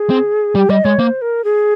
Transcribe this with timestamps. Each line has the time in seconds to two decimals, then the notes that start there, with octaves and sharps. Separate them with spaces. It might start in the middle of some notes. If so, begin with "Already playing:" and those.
Already playing: G#4
0.10 C4
0.55 G3 G4
0.70 G3 D#5
0.85 G#3 C#5
0.99 A#3 C5
1.22 A#4
1.44 G#4